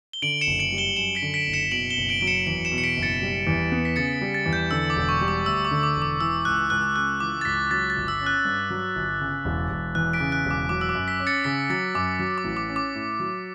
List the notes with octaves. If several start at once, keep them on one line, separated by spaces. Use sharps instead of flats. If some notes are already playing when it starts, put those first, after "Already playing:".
G7
D3 D7 F#7
C#7 E7
F#1
D7 F#7
G3
E7 G7
F#2 C#7 E7
B6 D7
D3
B6 D7
F#1
C#7 E7
B2 D7 F#7
E7 G7
F#1
D7 F#7
F#3 D7
C#7 E7
E2 D7 F#7
C#7 E7
B2
C#7
B6 D7
F#1
A6 C#7
G3
E2
B3
B6
C#3 A6 C#7
G3
A6
E2
G6
D3 E6
D6
E1
C#6
G3
D6
D2 E6
D6
D3
D6
E1
D6
E3 E6
C#2 F#6
C#2 F#6
C#3 F#6
E3 D6
A6
C#2 B6
F#3 A6
A6
G1
E6
C#4
F#6
G2
F#3
G1
C#3
E1
E1
E2 F#6
B6 D7
C#3
F#6
E1
D6
F#3 D6
E6
D6
F#2
B6
C#4
A6 C#7
C#3 B6
F#3 A6
F#2 D6
F#3
D6
A1
D6
C#4
D6
A2
F#3